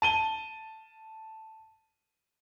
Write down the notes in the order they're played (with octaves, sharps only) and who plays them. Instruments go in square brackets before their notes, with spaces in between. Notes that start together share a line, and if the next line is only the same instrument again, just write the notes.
[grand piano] A5 D#7 G7